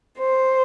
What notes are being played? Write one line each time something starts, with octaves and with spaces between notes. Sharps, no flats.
C5